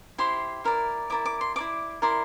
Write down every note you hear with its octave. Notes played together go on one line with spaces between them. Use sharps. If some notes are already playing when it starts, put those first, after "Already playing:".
E4 G4 C5 C6
E4 A#4 D5
E4 A#4 D5 D6
D6
C6
E4 A#4 D5 D6
E4 A#4 D5 C6